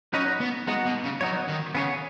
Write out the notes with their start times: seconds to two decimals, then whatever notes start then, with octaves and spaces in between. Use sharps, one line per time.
0.13 F#3 C#4 D#4 B4 D#5
0.40 B3
0.68 G#3 B3 D#4 F#4
0.86 B2
1.04 C#3
1.21 F#3 B3 D#4 F#4 C#5
1.48 D#3
1.75 C#3 B3 G#4 C#5